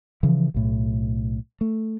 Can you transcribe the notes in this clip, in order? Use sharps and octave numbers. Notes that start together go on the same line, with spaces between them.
C#3 E3 F3
B1 A2
A3